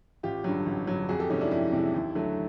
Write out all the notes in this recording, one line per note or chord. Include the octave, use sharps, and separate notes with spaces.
A1 F4 G4
G2 D3 F#3
A1
G2 D3 F#3
F2 F#4 G#4
G4 A4
C3 E3 G#3 C#4 D#4
D4 E4
F2 D4 E4
C3 E3 G#3
D#2
D3 F#3 A3